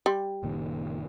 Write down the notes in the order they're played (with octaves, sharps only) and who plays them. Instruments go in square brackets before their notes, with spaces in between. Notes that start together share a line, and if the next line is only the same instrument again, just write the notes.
[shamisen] G3
[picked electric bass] F#1 A#2 D#3